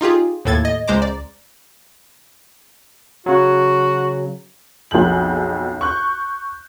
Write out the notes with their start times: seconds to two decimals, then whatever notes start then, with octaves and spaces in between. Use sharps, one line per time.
0.01 D#4 F4 G4 G#4
0.45 D#2 A2 A4 G#6 A6
0.65 D#5
0.88 C#2 G#3 C5 A#5 D6
1.02 D5
3.26 C#3 F#3 F#4
4.91 B1 F2 G#4 G6 F#7
5.81 C#6 F#6 G6